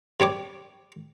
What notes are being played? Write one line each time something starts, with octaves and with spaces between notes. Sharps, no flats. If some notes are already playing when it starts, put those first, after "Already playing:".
C3 G3 C#5 D6